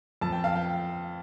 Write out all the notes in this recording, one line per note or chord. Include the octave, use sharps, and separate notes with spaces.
F2 A5
G5
F5
G5